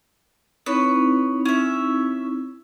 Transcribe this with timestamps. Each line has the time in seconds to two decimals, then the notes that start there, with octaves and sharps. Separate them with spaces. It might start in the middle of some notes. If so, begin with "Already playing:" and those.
0.66 C4 D#4 E4 B4 C#5
1.45 C#4 E5